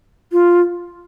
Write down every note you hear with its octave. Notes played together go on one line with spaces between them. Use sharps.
F4